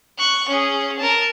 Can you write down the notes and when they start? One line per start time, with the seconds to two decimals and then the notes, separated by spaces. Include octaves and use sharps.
0.18 C#6 F#6
0.48 C#4 G#4
0.99 A#4 A5